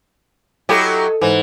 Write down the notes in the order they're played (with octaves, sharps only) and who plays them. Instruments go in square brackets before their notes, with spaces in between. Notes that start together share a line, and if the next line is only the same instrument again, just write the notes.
[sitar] F#3 E4 G4 [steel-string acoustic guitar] A4 D#5
[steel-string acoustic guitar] G#2 [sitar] E3